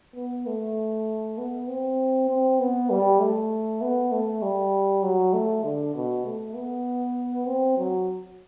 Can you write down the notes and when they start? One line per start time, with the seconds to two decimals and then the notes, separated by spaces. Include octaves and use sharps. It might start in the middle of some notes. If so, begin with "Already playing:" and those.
0.16 B3
0.46 A3
1.38 B3
1.68 C4
2.29 C4
2.60 B3
2.90 G3
3.20 A3
3.81 B3
4.12 A3
4.42 G3
5.03 F#3
5.33 A3
5.64 D3
5.95 B2
6.25 A3
6.55 B3
7.46 C4
7.77 F#3